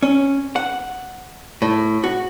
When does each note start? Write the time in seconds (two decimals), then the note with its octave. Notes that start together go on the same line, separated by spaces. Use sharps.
0.03 C#4
0.56 F#5
1.62 A2
2.04 F#4